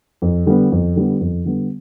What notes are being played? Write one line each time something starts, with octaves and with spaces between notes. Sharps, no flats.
F2
D3 G3 B3
F2
D3 G3 B3
F2
D3 G3 B3